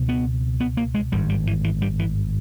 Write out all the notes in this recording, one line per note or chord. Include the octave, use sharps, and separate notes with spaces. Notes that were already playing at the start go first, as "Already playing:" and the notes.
Already playing: C#2 B2
B3
B3
A#3
G#3
G#1 G2 G3
G3
E3
E3
G3
E3